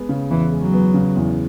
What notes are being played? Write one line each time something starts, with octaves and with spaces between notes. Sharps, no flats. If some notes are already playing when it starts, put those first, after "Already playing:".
Already playing: G#3 B3
C#3
E2 E3
G#3
F#3
B3
C#3
E2